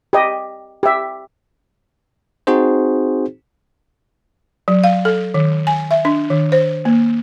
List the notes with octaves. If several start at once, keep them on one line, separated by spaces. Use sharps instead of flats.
G4 D#5
G4 E5
C4 D#4 F#4 G#4 C5
F#3
F5
A4
D#3
G#5
E5
D4
D#3
C5
A#3